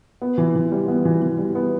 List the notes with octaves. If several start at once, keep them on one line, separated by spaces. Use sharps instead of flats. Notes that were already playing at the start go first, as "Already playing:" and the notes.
B3
E3
E3
G3
B3
E3
E3
G3
B3